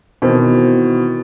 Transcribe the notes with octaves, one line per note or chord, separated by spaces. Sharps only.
B2 D#3 E3 C4